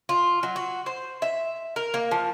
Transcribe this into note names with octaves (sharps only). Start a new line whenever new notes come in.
F4
F#3
F#4
C5
E5
A#4
A#3
F3